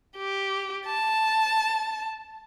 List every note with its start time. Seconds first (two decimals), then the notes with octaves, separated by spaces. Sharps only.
0.17 G4
0.86 A5